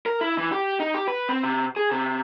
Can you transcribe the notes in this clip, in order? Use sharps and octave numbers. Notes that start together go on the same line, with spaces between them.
A#4
E4
E3
G4
D#4
G4
B4
C4
C3
G#4
C3